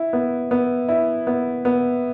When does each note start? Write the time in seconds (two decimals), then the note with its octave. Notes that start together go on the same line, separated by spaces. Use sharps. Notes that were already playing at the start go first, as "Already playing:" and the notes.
Already playing: E4
0.13 B3
0.51 B3
0.88 E4
1.27 B3
1.65 B3